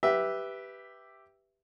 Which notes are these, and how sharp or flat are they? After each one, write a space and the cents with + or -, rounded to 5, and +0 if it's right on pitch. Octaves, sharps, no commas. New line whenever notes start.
G4 +0 B4 +0 E5 +0